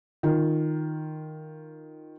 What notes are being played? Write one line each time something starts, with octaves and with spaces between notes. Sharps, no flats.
D#3 F4